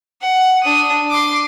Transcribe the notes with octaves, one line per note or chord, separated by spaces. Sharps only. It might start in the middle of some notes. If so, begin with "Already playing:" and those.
F#5
D4 D#6
C6 D6